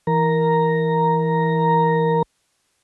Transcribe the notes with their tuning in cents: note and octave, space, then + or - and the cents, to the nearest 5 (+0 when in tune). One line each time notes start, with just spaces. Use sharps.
E3 +0 A#4 +0 A#5 +0